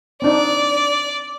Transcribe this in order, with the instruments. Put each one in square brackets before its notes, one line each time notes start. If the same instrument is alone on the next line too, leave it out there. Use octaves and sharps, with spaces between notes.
[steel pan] C4 D4 D#4 [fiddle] D5